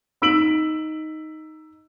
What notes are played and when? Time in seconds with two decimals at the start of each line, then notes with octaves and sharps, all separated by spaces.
0.22 D#4 E6 B6 D7 F#7